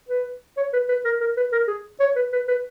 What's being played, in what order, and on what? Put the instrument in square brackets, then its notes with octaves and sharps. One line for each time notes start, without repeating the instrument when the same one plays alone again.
[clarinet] B4
C#5
B4
B4
A#4
A#4
B4
A#4
G#4
C#5
B4
B4
B4